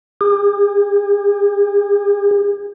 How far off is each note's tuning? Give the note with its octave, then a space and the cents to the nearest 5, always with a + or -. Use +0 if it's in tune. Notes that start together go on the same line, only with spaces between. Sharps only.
G#4 -45